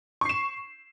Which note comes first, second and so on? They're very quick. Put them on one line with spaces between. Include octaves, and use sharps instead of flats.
C#6 C7 E7